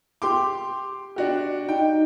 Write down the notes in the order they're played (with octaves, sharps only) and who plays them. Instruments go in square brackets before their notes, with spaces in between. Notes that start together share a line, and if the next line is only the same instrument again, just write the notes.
[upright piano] G4 C6 D6
D4 F#4 G4
[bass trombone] D#4 [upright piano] G5